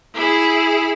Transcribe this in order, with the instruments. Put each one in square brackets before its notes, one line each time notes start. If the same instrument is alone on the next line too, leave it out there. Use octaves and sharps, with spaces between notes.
[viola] E4 G#4